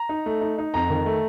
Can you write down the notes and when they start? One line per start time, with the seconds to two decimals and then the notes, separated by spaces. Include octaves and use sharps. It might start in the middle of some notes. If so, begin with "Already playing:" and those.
Already playing: A#5
0.09 D#4
0.26 A3
0.41 D#4
0.58 D#4
0.74 F2 A#5
0.90 D#3
1.06 A3